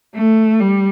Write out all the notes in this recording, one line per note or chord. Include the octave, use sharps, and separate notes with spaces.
A3
G3